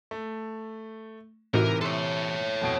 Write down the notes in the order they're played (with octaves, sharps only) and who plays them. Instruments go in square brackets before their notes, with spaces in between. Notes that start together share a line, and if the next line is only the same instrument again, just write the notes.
[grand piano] A3
[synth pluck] A2 D#4 F#4 [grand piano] C3 E3 [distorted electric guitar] A#4
[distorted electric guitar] A4 C#5 [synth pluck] E5 C6
[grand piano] F2 B2 D7